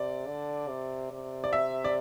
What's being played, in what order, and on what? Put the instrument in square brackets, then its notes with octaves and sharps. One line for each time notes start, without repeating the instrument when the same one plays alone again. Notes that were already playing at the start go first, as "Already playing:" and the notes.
Already playing: [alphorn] C3 [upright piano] D5
[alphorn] D3
C3
C3
[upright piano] D5
E5
D5